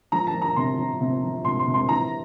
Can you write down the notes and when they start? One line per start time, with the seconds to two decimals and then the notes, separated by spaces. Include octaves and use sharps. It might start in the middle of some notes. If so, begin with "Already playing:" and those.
0.12 F3 A#5
0.27 A5
0.35 F3
0.42 A#5
0.56 C3 C6
0.78 F3
1.01 C3
1.23 F3
1.45 C3 C6
1.59 C6
1.67 C3
1.74 C6
1.89 E3 A#5